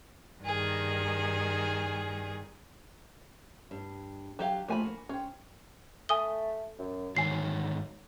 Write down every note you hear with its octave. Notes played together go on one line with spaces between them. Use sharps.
G2 D#3 G#4
G2
F#3 G4 F5
F3 A3 A#3 G#5 B5
F#4
C#4 C5 G5
A3 G#5 D#6 G7
F#2
G#2 D3 D#3 F#3 G#5 C7